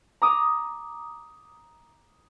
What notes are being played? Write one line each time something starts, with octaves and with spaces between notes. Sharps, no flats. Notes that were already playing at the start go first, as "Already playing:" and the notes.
A#5 D6 D#6